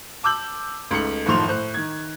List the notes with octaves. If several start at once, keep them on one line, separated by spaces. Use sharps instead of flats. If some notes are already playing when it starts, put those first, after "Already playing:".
A5 D6 E6 G6 F#7
C#2 A3 D#4 C#7 F#7
F#1 A2 D#3 F3 C6 F7
A2 C5 F#6
D#3 G#6